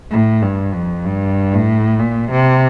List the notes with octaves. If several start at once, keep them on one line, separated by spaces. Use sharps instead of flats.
A2
G2
F2
G2
A2
A#2
C3